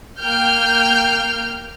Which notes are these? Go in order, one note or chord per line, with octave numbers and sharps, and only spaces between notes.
A#3 G5 F6 G6